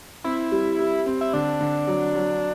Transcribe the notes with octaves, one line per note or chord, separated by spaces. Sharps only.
C4 E4
G3
G3
C4
E4
D3 D4
D3
F#3
F#3